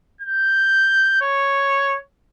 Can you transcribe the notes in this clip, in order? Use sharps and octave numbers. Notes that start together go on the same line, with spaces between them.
G6
C#5